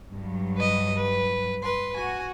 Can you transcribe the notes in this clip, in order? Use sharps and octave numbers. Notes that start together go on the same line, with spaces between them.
G2 F#3
B4 D#5
B4
B4 C6
F#4 G#5